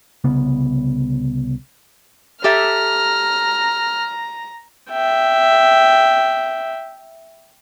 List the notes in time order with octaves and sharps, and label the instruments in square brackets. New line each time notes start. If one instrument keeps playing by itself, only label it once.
[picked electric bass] C2 C#3 B3
[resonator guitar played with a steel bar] G4 A4 E5 [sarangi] A#5 [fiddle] F6
[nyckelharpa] E5 G5